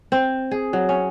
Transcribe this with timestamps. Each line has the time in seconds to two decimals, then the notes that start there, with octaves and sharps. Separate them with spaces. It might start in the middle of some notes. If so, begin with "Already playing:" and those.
0.12 C4
0.51 G#4
0.73 F#3
0.89 C#4